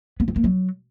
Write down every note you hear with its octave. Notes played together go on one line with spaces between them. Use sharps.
B3
C4
A#3
F#3